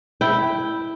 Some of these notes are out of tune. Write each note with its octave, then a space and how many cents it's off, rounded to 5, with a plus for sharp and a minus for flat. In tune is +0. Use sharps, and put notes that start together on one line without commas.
E4 -5 G5 +0